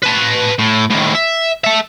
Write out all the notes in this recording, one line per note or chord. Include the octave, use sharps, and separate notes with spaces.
B4 A5
A2
A2 D#3
E5
A4 E5